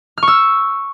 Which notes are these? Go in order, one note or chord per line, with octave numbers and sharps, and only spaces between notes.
F6
C#6
E6